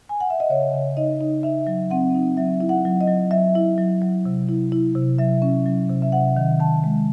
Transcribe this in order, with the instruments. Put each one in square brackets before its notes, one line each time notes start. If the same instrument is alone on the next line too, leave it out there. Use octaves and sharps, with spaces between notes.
[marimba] G#5
F#5
E5
D#5
C#3 C#5
C#3
D#4 D#5
D#4
D#4 E5
F#3
C4 F#5
D#4
F#3 E5
E4
F#5
F#3
D#5
F#3
F#3 E5
E4
F#3
F#3
C3
E4
E4
C3
F#3 E5
C#4
F#3
C3
E5
C3 F#5
D#3
D#3 A5
G#3